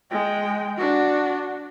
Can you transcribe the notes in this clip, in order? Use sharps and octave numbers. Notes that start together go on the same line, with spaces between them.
G#3 G5
D4 F#4